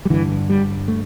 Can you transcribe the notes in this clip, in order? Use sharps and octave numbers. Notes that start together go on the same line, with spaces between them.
G3
G2 D3 E3
G3
A3